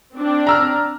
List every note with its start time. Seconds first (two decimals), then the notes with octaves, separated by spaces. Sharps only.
0.16 C4 D4
0.47 A#5 E6 F6